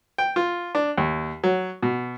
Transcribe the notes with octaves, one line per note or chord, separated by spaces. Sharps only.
G5
F4
D4
D#2
F#3
B2